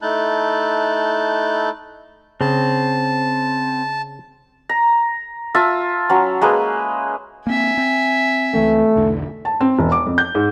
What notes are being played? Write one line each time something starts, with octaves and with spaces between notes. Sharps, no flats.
A3 D#4 E4 A5 F#6 G6
C#3 C4 A5
A#5
F4 E5 A5 E6
F#3 C#4
G#3 A#3 G#4 B4
A#3 C4 E5 G#5
C4
C#2 E3 A3 C4
B1 E2 D3
A5
C4
E1
D6
F2
G6
G#2